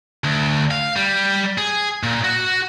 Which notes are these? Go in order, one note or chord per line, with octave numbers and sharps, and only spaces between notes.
D2
F5
G3
G#4
A#2
F#4